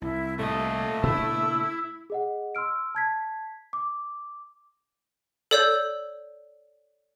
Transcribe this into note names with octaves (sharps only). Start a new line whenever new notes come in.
C2 E4
A#2 A3 A4 D#5
A#2 C#3 D4 E4 E6
G#4 D#5 F#5
C6 E6 F6 D7
A5 G#6 B6
D6
A4 C#5 D5 E6 G6